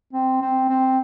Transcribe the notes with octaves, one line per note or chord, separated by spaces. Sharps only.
C4
C4
C4